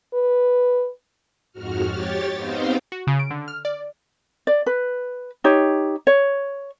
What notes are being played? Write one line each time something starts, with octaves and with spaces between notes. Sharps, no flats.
B4
F2 G#2 F#4 F6
G4 C#5 A6
B3 C4 D#4 C5 F5 G5
F#4
C#3
D7
D3
F6
D5
D5
B4
D#4 G4 C#5
C#5